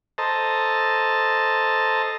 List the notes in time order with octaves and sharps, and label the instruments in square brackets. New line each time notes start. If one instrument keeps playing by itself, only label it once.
[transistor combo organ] A4 C5 D#5 A5 A#5